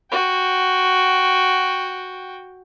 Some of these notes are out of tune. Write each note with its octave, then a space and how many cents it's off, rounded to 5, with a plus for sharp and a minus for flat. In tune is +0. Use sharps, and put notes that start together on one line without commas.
F#4 +0 G5 +0